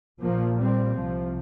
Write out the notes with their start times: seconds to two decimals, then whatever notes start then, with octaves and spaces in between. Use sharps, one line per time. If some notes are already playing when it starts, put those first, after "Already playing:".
0.20 A#1 A#2 F3 A#3
0.59 G3 C4
0.96 C2 C3 F3